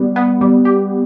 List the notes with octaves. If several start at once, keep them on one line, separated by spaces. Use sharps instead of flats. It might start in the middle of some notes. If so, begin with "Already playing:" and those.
Already playing: G3 B3
B3
G3
G4